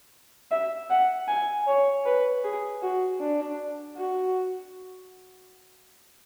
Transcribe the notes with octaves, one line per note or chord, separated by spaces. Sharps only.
E5
F#5
G#5
C#5
B4
G#4
F#4
D4
F#4